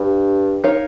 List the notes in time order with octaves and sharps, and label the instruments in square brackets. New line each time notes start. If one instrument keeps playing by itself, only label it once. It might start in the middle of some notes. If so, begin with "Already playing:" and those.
Already playing: [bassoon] G2
[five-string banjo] D#4 A#4 C#5 F5